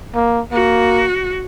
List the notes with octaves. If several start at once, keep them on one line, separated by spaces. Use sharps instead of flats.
A#3
A#3 F#4